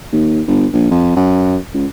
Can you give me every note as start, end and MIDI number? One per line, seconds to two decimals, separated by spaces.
0.12 0.41 39
0.47 0.66 31
0.73 0.90 34
0.91 1.13 41
1.16 1.57 42
1.74 1.86 37